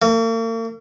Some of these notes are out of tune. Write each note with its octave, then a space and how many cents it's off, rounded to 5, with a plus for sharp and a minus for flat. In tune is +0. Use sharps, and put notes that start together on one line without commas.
A#3 -45